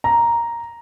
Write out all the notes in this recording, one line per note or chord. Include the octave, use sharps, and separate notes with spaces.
A#5